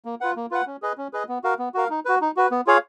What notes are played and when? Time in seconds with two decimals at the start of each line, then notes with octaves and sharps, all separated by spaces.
0.05 A#3
0.21 F4 B4 F#5
0.36 A#3
0.51 F4 B4 F#5
0.67 C#4
0.82 G#4 B4 D#5
0.98 C#4
1.13 G#4 B4 D#5
1.29 B3
1.44 F#4 A#4 F5
1.59 B3
1.74 F#4 A#4 F5
1.90 D#4
2.05 F#4 B4
2.21 D#4
2.37 F#4 B4
2.51 B3
2.67 F4 G#4 C#5 F5